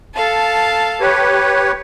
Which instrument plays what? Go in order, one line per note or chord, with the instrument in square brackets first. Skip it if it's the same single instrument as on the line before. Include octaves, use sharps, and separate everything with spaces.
[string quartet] A4 F5 A5
[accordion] G4 B4 C#5